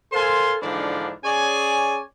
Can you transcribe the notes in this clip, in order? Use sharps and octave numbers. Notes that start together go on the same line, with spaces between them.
A4 A#4 C5 F5 G#5 C6
G#2 D3 E3 F3 A#3 D4
C#4 G#4 C#5 D5 G#5